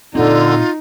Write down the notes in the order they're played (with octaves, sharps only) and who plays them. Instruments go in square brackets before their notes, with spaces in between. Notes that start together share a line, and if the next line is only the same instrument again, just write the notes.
[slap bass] A#2 C4 [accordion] D3 [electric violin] D#4 [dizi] F4